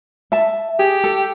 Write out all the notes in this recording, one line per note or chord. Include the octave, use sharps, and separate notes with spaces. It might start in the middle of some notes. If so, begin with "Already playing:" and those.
E5 A5
G4 G#4
A4